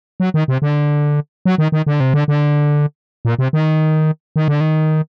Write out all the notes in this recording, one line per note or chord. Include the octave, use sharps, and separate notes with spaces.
F#3
D#3
C3
D3
F#3
D#3
D#3
D3
C3
D3
D3
A#2
C3
D#3
D#3
D3
D#3